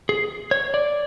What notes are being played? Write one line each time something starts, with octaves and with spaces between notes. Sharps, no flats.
G#4
C#5
D5